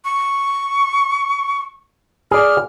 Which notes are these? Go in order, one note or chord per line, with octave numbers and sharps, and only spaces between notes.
C#6
G#4 D5 F6